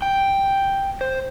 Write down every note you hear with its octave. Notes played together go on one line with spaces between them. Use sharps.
G5
C5